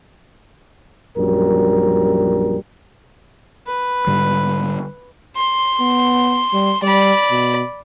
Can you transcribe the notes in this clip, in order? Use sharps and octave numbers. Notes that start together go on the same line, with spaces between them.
A#1 F#2 G3 A#4
B4
G#2 D3 G3
C6
B3
G3
G3 D5 B5
B2